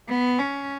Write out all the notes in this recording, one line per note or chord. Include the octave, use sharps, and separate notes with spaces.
B3
C#4